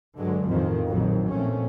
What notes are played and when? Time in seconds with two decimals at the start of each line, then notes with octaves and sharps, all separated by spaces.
0.18 G2 D3 F#3 G#3
0.48 A1 F2 D#3 F3
0.89 A#1 F2 D#3 F3 F#3
1.32 A#1 F3 A3 C4 C#4